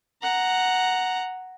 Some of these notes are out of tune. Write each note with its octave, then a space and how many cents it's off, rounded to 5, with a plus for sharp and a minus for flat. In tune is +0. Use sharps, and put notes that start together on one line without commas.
F#5 +0 A#5 +0